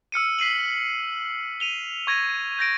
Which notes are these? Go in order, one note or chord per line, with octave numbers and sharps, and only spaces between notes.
E6 F6 C#7 D#7
B6 C7 D#7 F#7
D#7 F7 G7
C#6 G#6 A#6 D#7
G6 A#6 D7